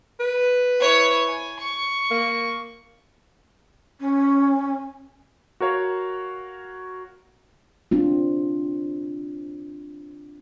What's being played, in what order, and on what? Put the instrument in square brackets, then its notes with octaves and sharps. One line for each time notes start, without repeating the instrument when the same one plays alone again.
[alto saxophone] B4
[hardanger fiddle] E4 C#5
G#5
C#6
[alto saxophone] A#3
[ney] C#4
[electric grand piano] F#4 A#4 C#5 F5
[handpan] C4 D4 F4